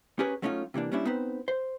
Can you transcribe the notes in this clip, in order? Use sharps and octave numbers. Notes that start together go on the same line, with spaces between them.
C#4 G4 G#4 A#4 B4 C#5
F#3 A3 C#4 D#4 F4
C3 E3 A#3 D4
G3 A#3 C#4 D4 E4
B3 C4 D#4 B4 C5
C5